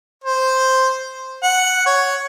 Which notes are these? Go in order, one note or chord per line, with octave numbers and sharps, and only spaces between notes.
C5
F#5
C#5